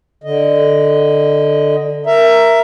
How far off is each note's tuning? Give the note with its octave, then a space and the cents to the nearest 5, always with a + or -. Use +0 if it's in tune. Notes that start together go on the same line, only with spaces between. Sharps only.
D3 +5 D#5 +0
A#4 +0 E5 +15 A#5 +0